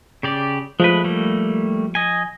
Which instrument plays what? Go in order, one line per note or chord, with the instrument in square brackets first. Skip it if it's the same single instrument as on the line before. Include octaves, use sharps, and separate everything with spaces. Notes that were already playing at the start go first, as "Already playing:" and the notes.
[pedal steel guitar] C#3 G4 D5
[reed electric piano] F3 [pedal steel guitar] G#3 A3 B4
[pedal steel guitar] G3 A3 A#3
D#5 G#5